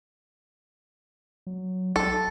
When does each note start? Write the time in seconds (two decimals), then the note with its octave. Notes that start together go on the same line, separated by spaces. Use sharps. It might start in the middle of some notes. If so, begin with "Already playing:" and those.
1.47 F#3
1.96 B1 A4